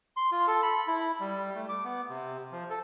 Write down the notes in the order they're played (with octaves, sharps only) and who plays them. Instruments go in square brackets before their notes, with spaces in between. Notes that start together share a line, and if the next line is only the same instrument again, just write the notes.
[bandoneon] C6
F4
A4
B5
E4
G3
A3
D6
B3
C3
F3
A4